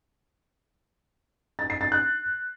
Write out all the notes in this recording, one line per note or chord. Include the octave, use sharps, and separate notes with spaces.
A6
C7
A6
F#6